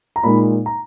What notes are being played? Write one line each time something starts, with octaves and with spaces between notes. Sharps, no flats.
A#5
A#2 G#3 D#4 B5
A#5